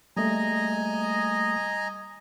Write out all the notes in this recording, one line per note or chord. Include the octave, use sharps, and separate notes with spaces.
G3 A3 A#3 D#5 G#5 A#5